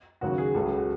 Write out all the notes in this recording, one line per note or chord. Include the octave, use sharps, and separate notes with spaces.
D#2 C#3 F#3 F#4
G#4
C#2 C#3 F#3 A4
G#4
F#4